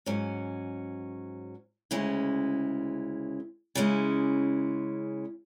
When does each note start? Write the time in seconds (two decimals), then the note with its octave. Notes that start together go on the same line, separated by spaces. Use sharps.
0.06 G#2 F#3 C#4
1.91 D2 C#3 G#3 C#4 E4
3.75 C#3 G#3 C#4 E4